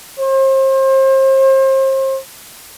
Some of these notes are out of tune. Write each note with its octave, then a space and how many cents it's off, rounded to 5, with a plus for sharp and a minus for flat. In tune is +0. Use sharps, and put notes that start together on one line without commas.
C5 +35